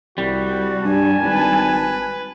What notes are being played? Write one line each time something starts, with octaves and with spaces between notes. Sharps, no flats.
C2 G3 F#4
G2 G#5 A5
G#1 B4